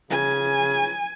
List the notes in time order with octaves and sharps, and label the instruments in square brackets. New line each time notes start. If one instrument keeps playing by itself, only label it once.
[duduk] C#3 [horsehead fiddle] G#5